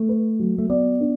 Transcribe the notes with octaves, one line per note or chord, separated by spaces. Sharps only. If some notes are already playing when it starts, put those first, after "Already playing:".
Already playing: A3
B4
F#3
A3
B3 D5
D4